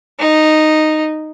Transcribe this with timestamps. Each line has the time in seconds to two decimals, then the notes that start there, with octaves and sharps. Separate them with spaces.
0.20 D#4